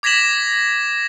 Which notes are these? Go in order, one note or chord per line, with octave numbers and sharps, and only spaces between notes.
D6 G#6 A#6 B6 E7 F#7